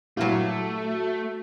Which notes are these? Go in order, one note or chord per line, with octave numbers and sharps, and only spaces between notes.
G2 A#2 F#3 A3 E4 F#4 G4 F5